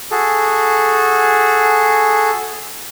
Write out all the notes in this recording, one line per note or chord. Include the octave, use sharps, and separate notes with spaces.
F#4 G#4 A4